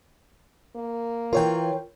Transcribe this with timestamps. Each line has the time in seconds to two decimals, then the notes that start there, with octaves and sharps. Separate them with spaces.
0.76 A#3
1.33 E3 F4 A#4 C#5 G5